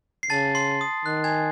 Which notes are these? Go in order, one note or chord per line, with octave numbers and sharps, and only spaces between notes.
C7
C#3 A5 A6
C6 C7
D#6
D#3 F#6
G#5 G#6